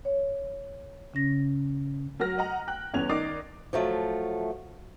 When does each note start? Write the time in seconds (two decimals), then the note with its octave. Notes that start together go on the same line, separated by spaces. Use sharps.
0.05 C#5
1.14 C#3 C#4 A#6
2.19 F#3 A#4 F#5 F6 A#6
2.38 D#5 F#5 A#5
2.67 G5 F#6
2.93 G1 E2 B3 C#4 G#6 F7
3.09 D#3 D#4 D5 D6 A6 C7
3.73 F3 F#3 A3